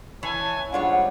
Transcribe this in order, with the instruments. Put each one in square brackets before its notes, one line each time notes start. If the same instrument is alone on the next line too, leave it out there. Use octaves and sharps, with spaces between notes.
[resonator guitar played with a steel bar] E3 [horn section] C#5 G#5 A5
[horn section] G#2 G3 [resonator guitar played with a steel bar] D4 F4 C#5 [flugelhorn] F#5